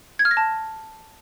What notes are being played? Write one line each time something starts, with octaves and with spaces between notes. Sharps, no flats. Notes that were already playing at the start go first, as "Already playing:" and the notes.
G#6
F6
A#6
A5